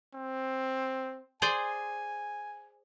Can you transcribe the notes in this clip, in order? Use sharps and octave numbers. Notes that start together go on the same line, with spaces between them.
C4
G#4 C5 D5 G#5